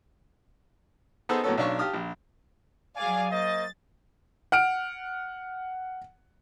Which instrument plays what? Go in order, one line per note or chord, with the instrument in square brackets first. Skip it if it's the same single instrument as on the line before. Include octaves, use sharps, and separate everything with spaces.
[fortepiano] B3 D#4 G#4 A4 B4 C5
A2 F#3 A#3 B3 C#4 A4
B1 C#4 D4 F5 C#6
G4 F5 A5 D#6 F6
A#1
[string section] F#3 G#4 F5 [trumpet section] D5 G#5
[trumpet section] A#3 C5 D#5 [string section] A6
[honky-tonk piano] F#5 F6 D7